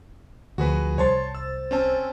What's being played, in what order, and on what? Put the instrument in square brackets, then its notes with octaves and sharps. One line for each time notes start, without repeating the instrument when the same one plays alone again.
[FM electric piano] D2 F3 [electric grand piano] F#4 G#4 B4
[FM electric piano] C2 C5 A6 [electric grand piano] C#5 A5 C6
[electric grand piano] E6
C4 C#4 A5